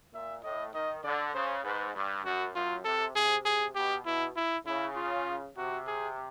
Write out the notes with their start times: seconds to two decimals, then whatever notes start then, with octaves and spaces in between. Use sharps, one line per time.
0.13 A#2 E5
0.43 A2 D#5
0.73 D#3 D#5
1.03 D3 D5
1.34 C#3 C5
1.64 G#2 B4
1.95 G2
2.25 F#2 F#4
2.54 F#2 F4
2.84 C3 A4
3.15 C3 G#4
3.45 G#4
3.75 B2 G4
4.06 B2 E4
4.36 E4
4.66 C#3 E4
4.96 F4
5.56 C3 F#4
5.87 G#4